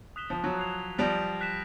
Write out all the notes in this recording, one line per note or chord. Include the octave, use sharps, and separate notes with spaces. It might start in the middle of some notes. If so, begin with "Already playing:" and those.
D#6 F#6 B6 E7 G7
F3
F#3
G#6 C7 F7
F3 G3 G6 A#6 D7 F7
F#6 B6 E7